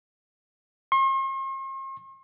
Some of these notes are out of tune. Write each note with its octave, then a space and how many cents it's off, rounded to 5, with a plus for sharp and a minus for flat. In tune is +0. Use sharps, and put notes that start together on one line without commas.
C6 +45